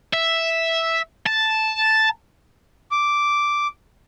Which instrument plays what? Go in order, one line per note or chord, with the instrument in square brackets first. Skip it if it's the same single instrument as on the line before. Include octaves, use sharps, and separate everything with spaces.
[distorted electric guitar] E5
A5
[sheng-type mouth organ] D6